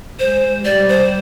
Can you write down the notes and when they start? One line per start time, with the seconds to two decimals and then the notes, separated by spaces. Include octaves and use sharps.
0.19 G#3 C5
0.65 G3 D5
0.89 C5